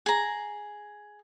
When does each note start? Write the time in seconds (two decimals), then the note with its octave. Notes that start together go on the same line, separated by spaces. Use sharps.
0.06 G#4 A#5